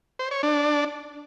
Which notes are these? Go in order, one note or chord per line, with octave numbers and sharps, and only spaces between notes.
C5
C#5
D4